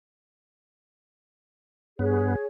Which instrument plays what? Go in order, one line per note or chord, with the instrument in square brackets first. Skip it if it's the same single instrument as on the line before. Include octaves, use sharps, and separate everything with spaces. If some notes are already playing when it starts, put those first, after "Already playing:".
[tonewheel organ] G2 B3 [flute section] G#4 C#5